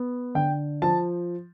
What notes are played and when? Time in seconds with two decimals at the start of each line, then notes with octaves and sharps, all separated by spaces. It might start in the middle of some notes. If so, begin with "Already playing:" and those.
Already playing: B3
0.35 D3 G5
0.82 F3 A5